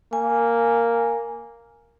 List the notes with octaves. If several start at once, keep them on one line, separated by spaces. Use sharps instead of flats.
A#3 G#5